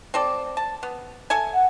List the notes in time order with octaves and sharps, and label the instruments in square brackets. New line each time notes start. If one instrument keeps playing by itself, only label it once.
[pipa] C4 A4 D5
A5
B3
A4 E5 G#5
[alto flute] F#5